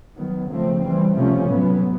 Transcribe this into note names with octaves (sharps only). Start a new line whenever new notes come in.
D#3 F#3 B3
C#3 F3 A3 C4
E3 G3 C4
C3 F3 A3 C#4
A2 F#3 B3